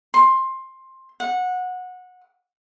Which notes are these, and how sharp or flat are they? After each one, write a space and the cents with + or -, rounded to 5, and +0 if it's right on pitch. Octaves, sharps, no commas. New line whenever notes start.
C6 +15
F#5 -20